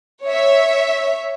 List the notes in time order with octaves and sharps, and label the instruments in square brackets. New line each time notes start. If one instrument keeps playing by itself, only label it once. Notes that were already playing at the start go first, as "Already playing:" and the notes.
[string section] C#5 E5